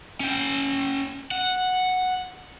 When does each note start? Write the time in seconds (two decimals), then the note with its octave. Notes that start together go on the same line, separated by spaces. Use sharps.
0.20 C#4 G5
1.31 F#5